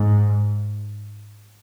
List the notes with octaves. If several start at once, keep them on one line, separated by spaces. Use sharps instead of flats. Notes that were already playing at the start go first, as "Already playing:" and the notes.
Already playing: G#2